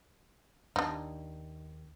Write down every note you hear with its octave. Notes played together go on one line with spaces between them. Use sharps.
D#2 D4 D#4